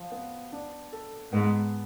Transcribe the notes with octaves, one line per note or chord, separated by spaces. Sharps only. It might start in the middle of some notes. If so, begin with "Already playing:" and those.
Already playing: F3
B3
D4
A4
G#2 B3